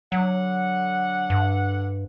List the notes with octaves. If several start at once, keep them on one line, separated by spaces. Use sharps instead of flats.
D3 F#3 F#5
G2